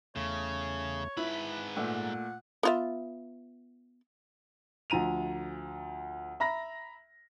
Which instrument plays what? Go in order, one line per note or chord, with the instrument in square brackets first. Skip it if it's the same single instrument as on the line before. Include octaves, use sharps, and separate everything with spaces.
[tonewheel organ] E2 A3 [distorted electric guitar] C#3 [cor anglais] C#5
[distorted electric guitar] G#2 B5 [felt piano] E4 [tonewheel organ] B4
[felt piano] A#2 A3 [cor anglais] F#5
[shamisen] B3 F4 E5
[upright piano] D2 F3 A#5 D#7 F7
E5 A#5 B5 A#6